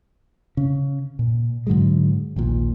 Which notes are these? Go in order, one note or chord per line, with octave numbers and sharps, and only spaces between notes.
C#3 C#4
A#2
G#2 D3 F#3 G#3
A#1 D#2 A#2